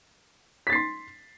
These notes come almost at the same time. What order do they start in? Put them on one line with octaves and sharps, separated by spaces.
B6 A6 C7 C6